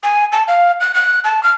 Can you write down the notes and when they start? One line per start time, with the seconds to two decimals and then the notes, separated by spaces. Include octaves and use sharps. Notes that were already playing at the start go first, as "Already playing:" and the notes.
0.03 G#5
0.32 A5
0.48 F5
0.80 F#6
0.94 F#6
1.24 A5
1.43 F6